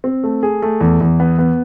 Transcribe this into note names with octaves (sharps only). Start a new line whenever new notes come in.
C4
A3
G#4
A3
E2
E2
B3
B3